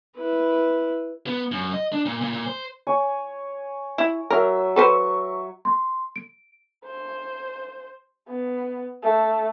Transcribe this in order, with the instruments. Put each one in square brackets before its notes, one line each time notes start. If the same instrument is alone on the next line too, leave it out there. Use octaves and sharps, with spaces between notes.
[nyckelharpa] E4 B4
[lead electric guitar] B3
F#2
D#5
D4
A#2
A#2
A#2
C5
[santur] C#5 G#5
[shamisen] E4
[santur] F#3 E5 [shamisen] A#4
[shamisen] A4 B4 C5 [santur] C#6
[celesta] C6
D7
[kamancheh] C5
B3
A3